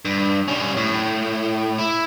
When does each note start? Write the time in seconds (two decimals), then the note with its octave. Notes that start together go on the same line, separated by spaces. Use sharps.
0.05 G2
0.48 G3 C#4
0.77 A2
1.79 E4